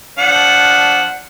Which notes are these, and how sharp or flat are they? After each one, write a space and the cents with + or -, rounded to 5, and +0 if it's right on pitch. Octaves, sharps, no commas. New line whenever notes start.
F3 +0 D4 -25 F#5 +0